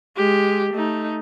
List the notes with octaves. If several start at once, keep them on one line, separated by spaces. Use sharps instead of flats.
G#3 G4
A3 D#4